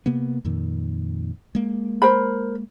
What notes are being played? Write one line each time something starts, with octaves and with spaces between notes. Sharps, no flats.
C3 A#3 B3
F2 A#2 D#3
G#3 A#3
A#4 C5 B5